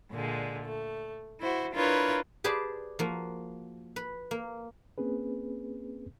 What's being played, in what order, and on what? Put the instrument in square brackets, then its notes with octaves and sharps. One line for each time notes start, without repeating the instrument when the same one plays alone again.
[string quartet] A#2 D3 G#3
A3
E4 F#4 C5
D4 E4 F4 A#4 B4 C#5
[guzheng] G4 G#4 B4 C5 D5 A5
F3 A#3 F#4
B4
A#3
[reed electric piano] A#3 C4 C#4 G#4 B4